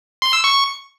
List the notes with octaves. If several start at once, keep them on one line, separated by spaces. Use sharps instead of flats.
C6
E6
C#6